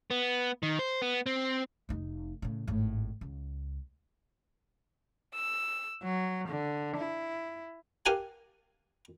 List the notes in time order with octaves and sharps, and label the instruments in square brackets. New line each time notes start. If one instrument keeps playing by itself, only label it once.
[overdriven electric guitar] B3
D#3
C5
B3
C4
[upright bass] F1 D#4
A2 C#3
G#1 A2
C#2
[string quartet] E6
F#3
D3
E4
[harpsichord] G4 A#4 F5 F#5 G#5 A5